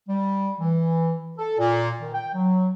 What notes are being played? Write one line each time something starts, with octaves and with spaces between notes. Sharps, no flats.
G3
E3
A4
A#2
D#3
G5
F#3